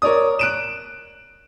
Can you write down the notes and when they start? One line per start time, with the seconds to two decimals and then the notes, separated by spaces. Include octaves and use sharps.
0.02 A#4 C#5 D5 D#6
0.39 F#6 D7 E7